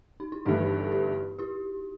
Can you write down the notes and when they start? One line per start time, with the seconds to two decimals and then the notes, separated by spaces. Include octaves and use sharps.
0.20 D#4
0.32 E4
0.45 G1 G2 E3 A3 D#4 F#4
0.92 E4 G4
1.39 E4 G4